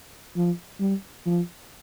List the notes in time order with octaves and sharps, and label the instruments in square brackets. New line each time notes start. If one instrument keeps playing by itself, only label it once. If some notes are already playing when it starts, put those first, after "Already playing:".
[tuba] F3
G3
F3